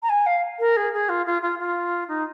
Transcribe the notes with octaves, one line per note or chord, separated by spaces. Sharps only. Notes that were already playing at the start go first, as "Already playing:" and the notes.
A#5
G#5
F5
A#4
G#4
G#4
F4
F4
F4
F4
D#4